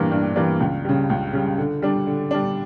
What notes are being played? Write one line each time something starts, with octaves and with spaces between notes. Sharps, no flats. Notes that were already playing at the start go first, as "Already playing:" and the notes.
Already playing: G2 E3 G3 A#3 D4
G2
E3 G3 A#3 D4
C#2
C#3 G3
C#2
C#3 G3
D3
G3 D4
D3
G3 D4